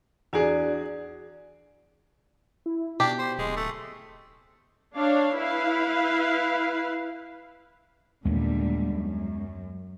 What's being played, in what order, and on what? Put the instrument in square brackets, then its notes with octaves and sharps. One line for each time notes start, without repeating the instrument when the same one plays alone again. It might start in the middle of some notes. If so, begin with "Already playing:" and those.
[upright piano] E2 G#4 [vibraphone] D4 F#4 D5
[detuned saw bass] E4
[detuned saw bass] B2 [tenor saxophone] D4 [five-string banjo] G4
[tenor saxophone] C5
[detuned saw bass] D1 [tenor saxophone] G#3
[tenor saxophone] A3
[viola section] D4 C#5 F5
E4 B4 F5
[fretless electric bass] D#2 A#3 D4 [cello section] A#2 D3 G3 [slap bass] G#3 B3
[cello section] F#2